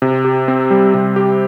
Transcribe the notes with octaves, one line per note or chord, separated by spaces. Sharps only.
C3
G4
C4
G3
C3
G4